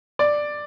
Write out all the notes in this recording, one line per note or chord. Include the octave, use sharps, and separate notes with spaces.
D5